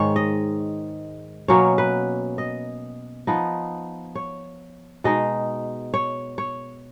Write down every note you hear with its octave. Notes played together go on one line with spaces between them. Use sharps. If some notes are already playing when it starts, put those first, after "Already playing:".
Already playing: G#2 D#3 G#3 C#5
D#5
B2 F#3 A#3 C#4 C#5
B4
D#5
F3 B3 D#4 D#5
C#5
B2 G#3 D#4 D#5
C#5
C#5